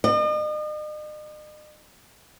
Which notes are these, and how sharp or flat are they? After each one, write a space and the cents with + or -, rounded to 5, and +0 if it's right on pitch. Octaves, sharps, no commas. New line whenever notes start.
D#5 -40